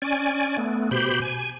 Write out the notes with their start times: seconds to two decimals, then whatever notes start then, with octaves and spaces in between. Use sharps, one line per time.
0.02 C#4 D5 G#5
0.57 A3 B3
0.91 B2 G4 C5 B5 G6
1.21 G#5